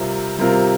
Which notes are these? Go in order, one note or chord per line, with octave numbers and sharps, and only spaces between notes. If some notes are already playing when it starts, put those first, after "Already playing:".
Already playing: C3 G3 C4 F4 A#4
C3 G3 C4 F4 A#4